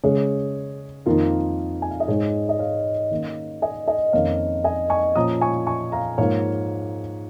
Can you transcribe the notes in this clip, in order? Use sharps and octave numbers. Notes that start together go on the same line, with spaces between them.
C#3 G#3 C#4 G#4 C#5
F2 D#3 A#3 D#4 F4 A#4
G#5
F5
D#5
G#2 G#3 D#4 G#4 C#5
D#5
C#5 F5
D#3 A#3 C#4
D#5 G#5
D#5 G#5
F2 D#3 A#3 C#4 C#5 F5
D#5 G#5
G#5 C#6
A#2 F3 C#4 A#5 D#6
G#5 C#6
G#5 C#6
F5 A#5
G#2 F3 A#3 C#5 F5